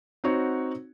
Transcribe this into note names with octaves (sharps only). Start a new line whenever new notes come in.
C4 D#4 F#4 C#5 F#5